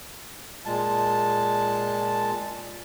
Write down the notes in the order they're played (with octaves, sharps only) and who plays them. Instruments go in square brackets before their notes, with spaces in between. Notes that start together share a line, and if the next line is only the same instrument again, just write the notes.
[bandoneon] A#2 G#3 A5